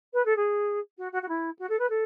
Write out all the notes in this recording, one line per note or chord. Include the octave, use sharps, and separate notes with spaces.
B4
A4
G#4
F#4
F#4
F#4
E4
F#4
A4
B4
A4